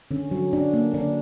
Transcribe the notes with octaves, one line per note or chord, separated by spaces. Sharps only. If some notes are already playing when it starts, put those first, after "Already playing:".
D3 C#4
F#3
D3 D4
A#3
D3 D4